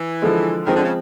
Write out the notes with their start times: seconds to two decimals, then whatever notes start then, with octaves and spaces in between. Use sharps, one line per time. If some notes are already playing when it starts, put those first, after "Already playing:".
Already playing: E3
0.22 D3 F3 G#3
0.67 D#3 F3 G#3 C4
0.76 D3
0.84 C#3